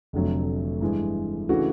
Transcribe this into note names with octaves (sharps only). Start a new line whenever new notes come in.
F1 F2 D3 F#3 A3
G2 E3 G#3
C#3 E3 A3 D4 F#4